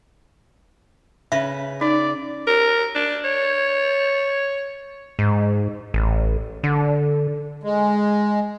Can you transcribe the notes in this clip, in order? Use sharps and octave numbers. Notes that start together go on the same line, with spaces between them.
C#3 B4 E5
D#4 D5
A#4
D4
C#5
G#2
A1
D3
G#3